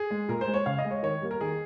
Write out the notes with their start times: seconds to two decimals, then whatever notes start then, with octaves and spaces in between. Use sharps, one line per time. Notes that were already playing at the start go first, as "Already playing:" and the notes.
Already playing: G#4
0.11 G#3
0.28 A#2 A#4
0.41 C5
0.47 G#3
0.54 C#5
0.66 C#3 F5
0.78 D#5
0.85 G#3
0.91 C#5
1.03 D#3 C#5
1.22 G3 A#3
1.31 A#4
1.41 D#3 G#4